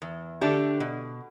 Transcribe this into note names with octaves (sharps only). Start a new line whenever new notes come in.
E2
D3 A3 D4 G4
B2